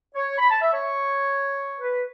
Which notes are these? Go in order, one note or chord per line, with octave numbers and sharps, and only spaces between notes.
C#5
B5
A5
E5
C#5
B4